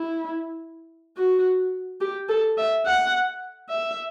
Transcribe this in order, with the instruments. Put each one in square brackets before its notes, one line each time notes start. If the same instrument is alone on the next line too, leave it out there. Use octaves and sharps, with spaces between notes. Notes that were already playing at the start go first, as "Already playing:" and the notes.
Already playing: [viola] E4
F#4
G4
A4
E5
F#5
E5